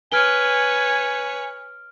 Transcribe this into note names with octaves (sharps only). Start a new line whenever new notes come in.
B4 C#5 G#5 F6 D7 G7